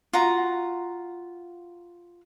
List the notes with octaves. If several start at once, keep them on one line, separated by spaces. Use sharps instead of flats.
F4 F#4 A#5